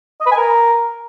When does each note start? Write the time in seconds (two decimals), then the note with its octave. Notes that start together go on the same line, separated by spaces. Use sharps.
0.21 D#5
0.26 B4
0.31 G#5
0.37 A#4